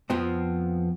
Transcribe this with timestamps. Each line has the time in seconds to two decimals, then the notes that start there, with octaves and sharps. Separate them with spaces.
0.10 F2 F3 B3 C4